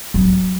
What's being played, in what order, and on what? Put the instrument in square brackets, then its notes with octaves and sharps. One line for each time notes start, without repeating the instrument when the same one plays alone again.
[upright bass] F#3